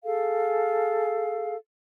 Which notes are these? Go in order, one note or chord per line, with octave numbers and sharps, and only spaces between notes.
G#4 A4 F5